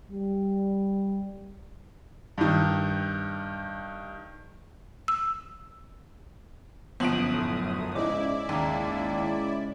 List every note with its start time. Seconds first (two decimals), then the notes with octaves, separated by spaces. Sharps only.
0.11 G3
2.38 G2 D#3
5.08 E6
7.00 G1 F#2 F3 B3 C6 D#6 D7 F#7
7.34 A2
7.95 G#2 C#3 E4 D5 D#5 D6
8.49 D#2 G5 A#5